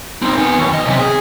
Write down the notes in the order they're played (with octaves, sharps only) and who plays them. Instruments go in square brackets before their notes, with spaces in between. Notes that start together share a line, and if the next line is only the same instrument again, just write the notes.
[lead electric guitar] C4 D#4
B3 G#5
D#2
F#2 D#5
B1 C3
G#4